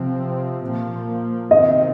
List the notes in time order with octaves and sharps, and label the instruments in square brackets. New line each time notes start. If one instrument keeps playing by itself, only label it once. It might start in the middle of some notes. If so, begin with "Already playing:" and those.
Already playing: [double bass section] C3 F3 C4
A#2 F3 A#3
[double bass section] C3 D#3 C4 [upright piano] D#5